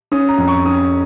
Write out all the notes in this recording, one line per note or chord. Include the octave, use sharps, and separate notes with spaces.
C#4 D#6
A#5
F2
C#6
C#4 D#6